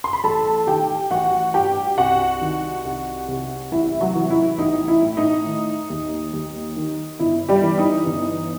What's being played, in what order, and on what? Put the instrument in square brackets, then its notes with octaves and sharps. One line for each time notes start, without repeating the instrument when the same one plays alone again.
[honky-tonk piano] C6
B5
A1 A4 A5
D#3 G4 G5
A1 F#4 F#5
G2 G4 G5
C2 F#4 F#5
D#3
C2
C3
A1 E4 E5
F#3 F#4
E3
E4
A1 D#4
E4
A2
D#4
D#3
D#2
D#2
D#3
G1 E4
G3 G4
E3
D#4
G1